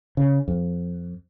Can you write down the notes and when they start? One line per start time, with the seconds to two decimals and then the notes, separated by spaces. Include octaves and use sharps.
0.17 C#3
0.48 F2